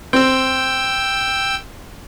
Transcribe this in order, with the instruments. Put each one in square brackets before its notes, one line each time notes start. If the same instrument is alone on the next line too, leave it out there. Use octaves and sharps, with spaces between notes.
[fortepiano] C4 [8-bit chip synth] G5 E6